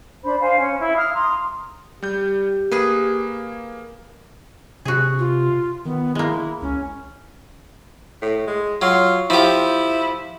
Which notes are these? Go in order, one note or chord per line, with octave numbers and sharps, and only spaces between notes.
D4 C5 B5
C5 F5 G#5
C#4
E4
F5 D#6 F6
A#5 C6 D#6
G3 G4 G6
A#3 G#4 B4
C3 F#4 G#4
F4
D#3 B3
G#3 A#3 E4
C#2 C#4
A2
G#3
F#3 F4
F3 E4 G4